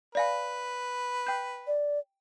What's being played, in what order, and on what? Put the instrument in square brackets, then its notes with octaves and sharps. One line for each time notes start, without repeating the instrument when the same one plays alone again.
[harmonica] B4 [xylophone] D5 F5 G#5
[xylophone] G5 G6
[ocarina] D5